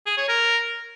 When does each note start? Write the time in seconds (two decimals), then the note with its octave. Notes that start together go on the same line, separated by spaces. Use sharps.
0.06 G#4
0.18 C#5
0.29 A#4